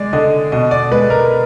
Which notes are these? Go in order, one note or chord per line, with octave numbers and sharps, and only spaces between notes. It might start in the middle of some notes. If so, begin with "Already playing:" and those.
Already playing: G#3 D5
D3 D#5
B2 D#5
D5
G#3 B4
A#4